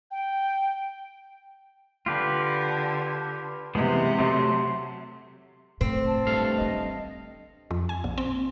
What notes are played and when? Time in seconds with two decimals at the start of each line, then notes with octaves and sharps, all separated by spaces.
0.11 G5
2.06 D3 F4 G4 B4
3.75 C3 E3 G#3 B3
4.19 F#3 A3 C6
5.81 A2 C4
6.07 A5
6.27 G2 A3 F5
6.57 E3 D4 D#5
7.71 F2
7.89 G#5
8.04 A#1
8.18 C4